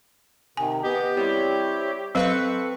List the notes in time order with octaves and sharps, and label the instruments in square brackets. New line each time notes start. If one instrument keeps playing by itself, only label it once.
[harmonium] C3 D#3 [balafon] G#5
[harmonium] B3 D#5 [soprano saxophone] G4
[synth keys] G3 [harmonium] C4 E4 C#5
[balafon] F#3 F5 [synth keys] C4 B4 C#6 [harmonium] A4